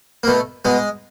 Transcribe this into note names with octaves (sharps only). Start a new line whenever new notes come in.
A#3
B2 A3
B2 G#3